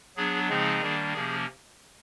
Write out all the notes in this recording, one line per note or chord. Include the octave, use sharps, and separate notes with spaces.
F#3 B3 D4 G#4
C#3 F3 G#3 C4 D#4 G#4
D#3 G3 A#3 D4
C3 F3 A#3 C#4 G#4